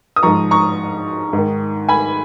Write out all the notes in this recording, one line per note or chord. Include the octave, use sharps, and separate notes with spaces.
D#6
G#2 F3 A#5 C#6
A#5 C#6
G#2 D#3
G#5 B5